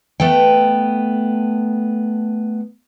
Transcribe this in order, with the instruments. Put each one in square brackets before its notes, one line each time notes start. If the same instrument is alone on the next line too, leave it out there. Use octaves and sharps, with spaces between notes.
[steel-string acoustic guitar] A3 B3 A4 G5